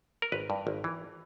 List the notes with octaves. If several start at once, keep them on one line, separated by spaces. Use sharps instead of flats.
A#4
G#1 B4
G2
G#1
E3